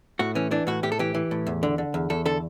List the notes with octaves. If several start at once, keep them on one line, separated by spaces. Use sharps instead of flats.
A2 F#4
E3 C#4
E3 D4
A2 F#4
A2 G4
A4
E3 G4
E3
A2
E2
D3
D3
E2
E2 A4
D3 A4